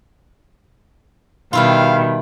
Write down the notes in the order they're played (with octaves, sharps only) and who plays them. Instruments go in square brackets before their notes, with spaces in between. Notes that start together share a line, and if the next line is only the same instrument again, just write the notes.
[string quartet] B2 D#3 [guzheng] G3 E4 F4 [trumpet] F5